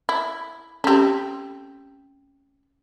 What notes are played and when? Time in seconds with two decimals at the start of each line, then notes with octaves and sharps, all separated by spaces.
0.09 E4
0.84 A3 C4 C#4 G4